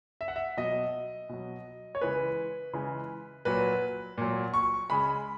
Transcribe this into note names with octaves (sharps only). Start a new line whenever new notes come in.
E5
F#5
E5
B2 F#3 D#5
B2 F#3
C#5
C#3 E3 G#3 B4
C#3 E3 G#3
A#2 F#3 B4
A#2 F#3
C#6
C#3 G#3 B5